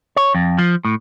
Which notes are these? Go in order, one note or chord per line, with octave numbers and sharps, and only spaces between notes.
C#5
F2
F3
A2